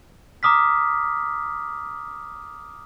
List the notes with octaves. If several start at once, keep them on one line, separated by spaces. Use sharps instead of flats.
A#5 D6 D#6 F6 B6